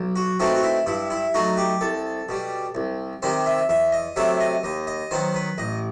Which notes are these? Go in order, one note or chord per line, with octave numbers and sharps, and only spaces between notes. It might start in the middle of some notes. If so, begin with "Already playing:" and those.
Already playing: B1
F#4
B2 A3 C4 D#4 F#4
F#4
E4
G2 E4
E4
F#3 A3 D#4 F#4
G4
C2 A4
B2 G3
C2
C3 D#3 G3 C4 C5
E5
E2 E5
D#5
C3 F#3 A3 E5
D#5
D#2 D#5
D#5
D#3 F#3 B3 C5
B4
A1 D#5